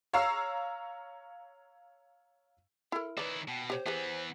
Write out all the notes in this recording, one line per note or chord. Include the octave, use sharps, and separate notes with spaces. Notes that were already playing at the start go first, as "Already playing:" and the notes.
C#5 F5 A#5 E6 C7
E4 A4 A#4
D#3 E4 B4 C#5 D5
B2 G5
G4 C5 C#5
E3 B3 G4 G#4 B4